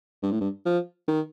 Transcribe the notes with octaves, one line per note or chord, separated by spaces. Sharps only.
G2
A2
G2
F3
D#3